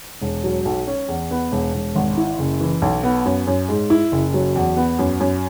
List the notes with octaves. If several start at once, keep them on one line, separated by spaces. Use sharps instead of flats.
E1
F#3
B1
C#4
E2
B3
E1
E1
G#1
E4
F#1
E3
B1
B3
F#2
F#2
G#2
E4
F#1
F#3
E2
B3
F#2
F#2